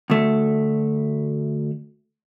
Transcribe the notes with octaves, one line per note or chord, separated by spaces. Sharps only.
D2 A3